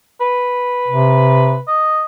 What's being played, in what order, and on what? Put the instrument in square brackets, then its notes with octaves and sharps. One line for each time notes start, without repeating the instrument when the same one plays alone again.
[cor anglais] B4
[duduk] C3
[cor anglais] D#5